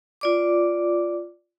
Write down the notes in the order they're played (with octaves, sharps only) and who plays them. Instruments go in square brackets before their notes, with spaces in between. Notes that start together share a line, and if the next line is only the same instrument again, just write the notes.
[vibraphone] F4 D5 D6